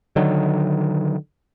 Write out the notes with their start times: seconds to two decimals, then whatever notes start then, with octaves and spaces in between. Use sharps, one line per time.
0.16 D3 D#3 F#3